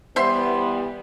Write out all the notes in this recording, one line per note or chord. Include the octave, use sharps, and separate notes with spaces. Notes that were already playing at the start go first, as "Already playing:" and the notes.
E3 G3 B3 C5 E5 C6